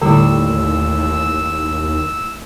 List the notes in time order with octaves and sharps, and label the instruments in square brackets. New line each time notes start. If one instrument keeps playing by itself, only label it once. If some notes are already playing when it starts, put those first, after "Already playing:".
[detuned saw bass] D#2 [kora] A2 G3 [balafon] D3 [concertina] E6